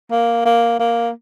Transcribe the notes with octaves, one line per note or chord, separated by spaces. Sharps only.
A#3
A#3
A#3